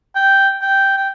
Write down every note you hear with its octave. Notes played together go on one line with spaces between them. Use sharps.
G5
G5
G5